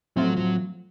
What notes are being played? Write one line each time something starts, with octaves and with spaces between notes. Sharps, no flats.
A2 F3 F#3 A3 C4 F4
F#3